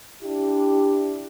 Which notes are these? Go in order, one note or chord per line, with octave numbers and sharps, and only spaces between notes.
D4 E4 G4